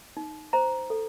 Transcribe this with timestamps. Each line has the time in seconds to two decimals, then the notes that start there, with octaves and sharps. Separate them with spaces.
0.17 D#4
0.53 C5 A#5
0.90 A4